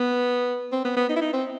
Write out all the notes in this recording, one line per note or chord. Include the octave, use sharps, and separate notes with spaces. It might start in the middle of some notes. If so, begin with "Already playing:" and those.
Already playing: B3
C4
B3
B3
D#4
E4
D#4
C4